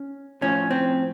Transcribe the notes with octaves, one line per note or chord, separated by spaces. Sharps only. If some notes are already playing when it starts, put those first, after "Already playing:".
Already playing: C#4
A2 F3 C#4
C4